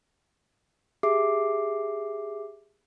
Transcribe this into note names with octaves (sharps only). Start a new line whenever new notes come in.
G4 G#4 E5 D6 C7